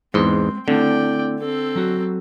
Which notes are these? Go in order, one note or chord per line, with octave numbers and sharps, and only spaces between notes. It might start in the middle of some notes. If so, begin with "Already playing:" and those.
E2 G#2 G#3 C4 C6
D3 A3 C4 E4 D5 G5
C4 A4
F#3 F#4